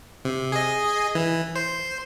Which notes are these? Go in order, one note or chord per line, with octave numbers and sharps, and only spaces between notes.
C3
G#4 D#5
E3
C5